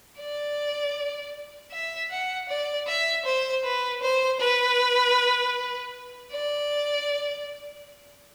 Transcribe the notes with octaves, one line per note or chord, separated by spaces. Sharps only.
D5
E5
F#5
D5
E5
C5
B4
C5
B4
D5